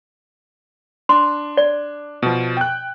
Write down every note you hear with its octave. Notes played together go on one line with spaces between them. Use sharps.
D4 C6
D5
B2 F3
G5 F#6